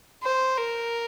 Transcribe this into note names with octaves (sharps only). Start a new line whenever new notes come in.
C5
A#4